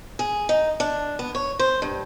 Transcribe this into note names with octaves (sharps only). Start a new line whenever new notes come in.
G#4
D#4
D4
B3
C#5
C5
G2